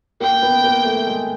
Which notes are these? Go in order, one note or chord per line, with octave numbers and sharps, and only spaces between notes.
A#3 G5
B3
A#3
A3
G#3